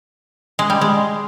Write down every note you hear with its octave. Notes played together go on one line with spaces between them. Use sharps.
G#3
G3
G#3